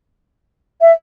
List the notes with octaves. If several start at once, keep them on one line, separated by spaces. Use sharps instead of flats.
E5